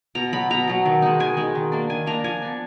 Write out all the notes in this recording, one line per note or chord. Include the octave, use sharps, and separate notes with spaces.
B2 A#5
F#3 B3 B5
B2 A#5
F#3 B3
D#3
G#3 D#4
D#3 G#5
G#3 D#4
D#3
A#3 D4
D#3 G#5
A#3 D4 A#5
F3 G#5
B3 D4